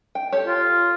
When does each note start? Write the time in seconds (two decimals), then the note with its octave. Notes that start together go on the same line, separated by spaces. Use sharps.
0.15 G5
0.32 G4 A4 C#5
0.47 F4